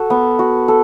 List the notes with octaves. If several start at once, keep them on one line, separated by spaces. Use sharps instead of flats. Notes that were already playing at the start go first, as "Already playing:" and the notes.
Already playing: F#4 A4
B3
F#4
A4